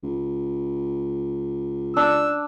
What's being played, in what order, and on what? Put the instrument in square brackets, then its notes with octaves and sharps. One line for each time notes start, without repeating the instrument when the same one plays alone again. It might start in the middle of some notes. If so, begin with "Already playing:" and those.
[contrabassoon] C#2
[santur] D4 [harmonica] E6